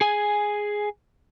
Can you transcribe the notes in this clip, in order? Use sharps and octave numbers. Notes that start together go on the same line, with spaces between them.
G#4 G#5